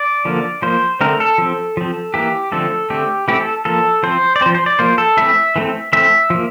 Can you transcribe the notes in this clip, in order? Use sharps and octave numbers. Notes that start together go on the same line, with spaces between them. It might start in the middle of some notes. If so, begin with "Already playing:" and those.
Already playing: D5
D3 F3 A#3
F3 A#3 C5
D3 A3 C4 A#4
A4
F3 C4
F3 C4
E3 A#3 G4
D3 F3 A3 C4 A4
D3 A3 C4 G4
E3 A3 C4 G4
A4
F3 A#3 A4
F3 C4 C5
D5
C4 C5
F3
C5
D5
F3 A#3 C5
A4
E3 A3 C4 E5
E3 A3 C4
E3 A3 C4 E5
F3 A#3